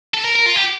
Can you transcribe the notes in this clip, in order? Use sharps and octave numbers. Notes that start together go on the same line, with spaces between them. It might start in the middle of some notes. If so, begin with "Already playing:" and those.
A4
A#4
A#4
F4
G4